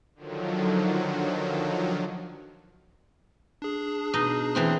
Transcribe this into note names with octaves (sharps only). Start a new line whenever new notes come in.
D3 D#3 F3 F#3
D4 G#4
B2 D#4 D#5
E3 C4 C6